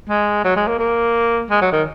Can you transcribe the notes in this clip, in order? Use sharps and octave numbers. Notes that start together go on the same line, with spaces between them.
G#3
F#3
G#3
A#3
A#3
G#3
F#3
D#3